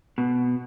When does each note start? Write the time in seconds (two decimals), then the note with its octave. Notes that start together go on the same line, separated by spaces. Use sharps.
0.18 B2